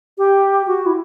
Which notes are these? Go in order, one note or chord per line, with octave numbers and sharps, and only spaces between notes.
G4
F#4
E4